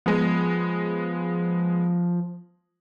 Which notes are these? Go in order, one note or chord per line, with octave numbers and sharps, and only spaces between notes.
F3 G#3 B3